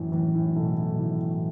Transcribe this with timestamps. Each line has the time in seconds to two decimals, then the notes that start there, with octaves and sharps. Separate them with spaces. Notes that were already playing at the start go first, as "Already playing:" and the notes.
Already playing: F#2 A2 E3
0.12 A2 E3
0.34 A2
0.56 B2 A3
0.92 B2
0.99 A2 E3